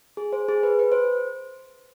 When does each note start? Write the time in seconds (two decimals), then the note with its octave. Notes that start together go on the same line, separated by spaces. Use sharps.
0.17 G#4
0.33 C5
0.48 G#4
0.63 B4
0.79 B4
0.92 C5